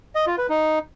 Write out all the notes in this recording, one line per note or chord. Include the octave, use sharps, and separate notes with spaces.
D#5
F4
B4
D#4